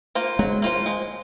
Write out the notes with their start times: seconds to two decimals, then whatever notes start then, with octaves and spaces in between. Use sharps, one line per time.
0.15 A#3 F4 C5
0.39 F#3 G#3
0.62 A#3 F4 C5
0.86 G#3